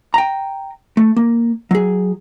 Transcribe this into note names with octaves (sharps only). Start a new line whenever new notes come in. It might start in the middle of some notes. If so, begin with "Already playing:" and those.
G5 A#5
A3
A#3
F#3 G#4